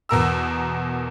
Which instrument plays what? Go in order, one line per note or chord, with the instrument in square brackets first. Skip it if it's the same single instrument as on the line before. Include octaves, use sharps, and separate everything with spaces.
[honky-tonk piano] E2 B2 A#4 E6